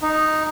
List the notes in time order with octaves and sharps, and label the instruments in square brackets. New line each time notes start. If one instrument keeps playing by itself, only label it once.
[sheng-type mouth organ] D#4